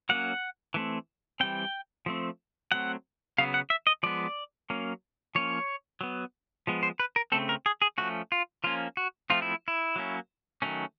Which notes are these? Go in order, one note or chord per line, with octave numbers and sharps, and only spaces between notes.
F#3 A#3 C#4 F#5
E3 A3 C4
E3 G3 C4 G5
F3 A3 C4
F#3 A3 C4 F#5
C#3 F#3 B3 F5
F#5
E5
D#5
F3 G#3 B3 D5
F#3 A#3 C#4
F3 A#3 C#4 C#5
F#3 B3
F3 G#3 B3
C5
B4
A#4
C#3 F3 A3 C4 A4
A#4
G#4
G#4
F3 A3 C#4 F#4
F4
F3 A#3 C#4 F4
F#4
F3 A3 C4 F4
E4
E4
F#3 A#3 C#4
D#3 F#3 A3 C#4